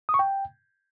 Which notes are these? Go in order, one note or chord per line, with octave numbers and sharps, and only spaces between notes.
D#6
C#6
G5